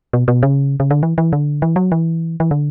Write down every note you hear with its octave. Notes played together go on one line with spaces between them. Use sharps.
B2
B2
C#3
C#3
D3
E3
E3
D3
E3
F#3
E3
E3
D3